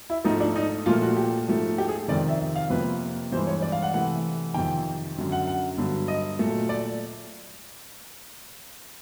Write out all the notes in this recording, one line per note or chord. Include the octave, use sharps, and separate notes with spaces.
E4
G#2 F3 A3 D#4
D4
D#4
A#2 F3 A3 F4
F#4
G4
G#2 F3 A3
G4
G#4
F2 C3 D#3 D5
E5
E5
F5
F2 C3 F3 A#3 B4
G2 E3 G#3 C5
C#5
D5
F5
F#5
C3 E3 A3 F#5
F2 C3 D#3 G5
F#2 D3 F#3
F#5
F#5
G2 D3 F#3
D#5
A#2 F#3 A3
D5